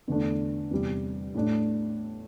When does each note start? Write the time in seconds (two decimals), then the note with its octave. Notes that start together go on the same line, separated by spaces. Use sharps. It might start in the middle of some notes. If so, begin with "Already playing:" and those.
0.08 E2 D3 A3 D4
0.71 E2 C3 G3
1.35 A2 A3 D4